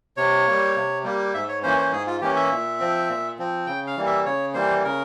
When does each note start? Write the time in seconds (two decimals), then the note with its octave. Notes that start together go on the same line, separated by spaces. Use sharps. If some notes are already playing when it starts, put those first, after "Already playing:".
0.17 C3 C#5
0.47 G3 A#3
0.76 C3
1.04 G3 A#3
1.34 G#2 E5
1.49 C#5
1.63 E3 A#3 C#4 C5
1.78 C5
1.92 G#2 G#4
2.07 F4
2.21 E3 A#3 C#4 G4
2.36 E5
2.51 A#2
2.80 F3 C4
3.08 A#2
3.39 F3 C4
3.66 C#3 G5
3.87 F5
3.97 E3 G3 A#3
4.06 E5
4.25 C#3 C#5
4.54 E3 G3 A#3 C5
4.84 C#3 A#4